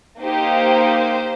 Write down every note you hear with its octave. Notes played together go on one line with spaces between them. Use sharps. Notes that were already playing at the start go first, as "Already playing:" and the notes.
A#3 D#4 G4 C5